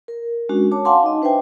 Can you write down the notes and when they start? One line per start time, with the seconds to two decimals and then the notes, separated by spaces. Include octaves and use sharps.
0.08 A#4
0.49 G#3 C#4 D4 F#4
0.72 C#5 A5 D6
0.85 F5 F#5 G#5 A5 C6 D6
1.03 D#4 D#5
1.22 D4 B4 C5 E5 G5 G#5